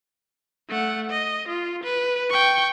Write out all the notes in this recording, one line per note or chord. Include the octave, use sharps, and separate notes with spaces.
A3 F#5
D#5
F4
B4
G5 C#6